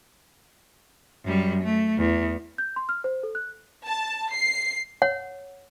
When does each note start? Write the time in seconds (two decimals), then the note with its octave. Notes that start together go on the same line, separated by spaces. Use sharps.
1.25 F#2 G3
1.64 A3
1.98 E2
2.58 G6
2.76 C6
2.89 F6
3.04 C5
3.23 A4
3.35 F#6
3.87 A5
4.35 C7
5.02 C#5 F#5